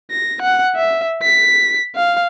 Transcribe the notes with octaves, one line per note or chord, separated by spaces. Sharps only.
A#6
F#5
E5
B6
F5